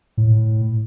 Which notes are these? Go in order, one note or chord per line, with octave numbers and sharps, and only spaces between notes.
A2